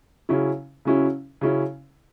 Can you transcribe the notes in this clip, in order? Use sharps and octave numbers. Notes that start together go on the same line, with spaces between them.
C#3 F#3 C#4 E4
C#3 F#3 C#4 E4
C#3 F#3 C#4 E4